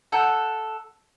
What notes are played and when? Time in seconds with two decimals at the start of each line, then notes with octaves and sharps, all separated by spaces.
0.12 A4 F#5 F#6 G6